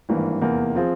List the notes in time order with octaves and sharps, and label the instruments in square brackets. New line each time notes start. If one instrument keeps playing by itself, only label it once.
[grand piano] G#1 G2 E3 A#3
F1 E2 E3 A#3
F3 C4 F4 G#4